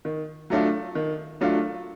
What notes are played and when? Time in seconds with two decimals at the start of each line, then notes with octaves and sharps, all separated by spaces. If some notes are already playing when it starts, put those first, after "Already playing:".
0.05 D#3
0.50 F#3 A3 D4 F4
0.95 D#3
1.41 F#3 A3 D4 F4